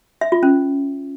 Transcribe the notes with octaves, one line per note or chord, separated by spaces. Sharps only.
E5
F4
C#4